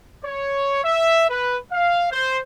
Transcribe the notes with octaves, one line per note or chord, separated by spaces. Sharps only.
C#5
E5
B4
F5
C5